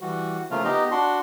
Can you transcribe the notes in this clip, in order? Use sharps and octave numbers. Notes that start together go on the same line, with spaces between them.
E3 G3 F#4
C#3 F3 A3 A#3 F4
B3 D#4 G4 D#5
D4 F#4 C6